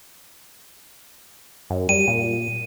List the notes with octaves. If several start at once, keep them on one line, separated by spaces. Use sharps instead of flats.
F#2
G3 D#7
A#2